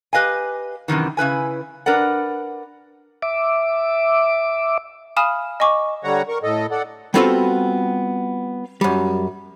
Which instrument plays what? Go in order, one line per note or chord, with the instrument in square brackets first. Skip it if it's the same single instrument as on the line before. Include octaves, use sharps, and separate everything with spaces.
[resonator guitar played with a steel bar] G4 B4 D#5 F5 G#5
F#2 C3 D#3 E3
C#3 E4 B4 G#5
D4 A#4 B4 D5 F#5
[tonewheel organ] E5 D6
[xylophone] F5 G#5 B5 D#6 F6 E7
D#5 G#5 C#6 D6
[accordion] D3 G3 C#5 F#5 A#5
A#4 C#6
A2 A4 D#5
A4 D5 F#5
[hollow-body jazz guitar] G3 B3 C4 F4 F#4 A4
F#2 G3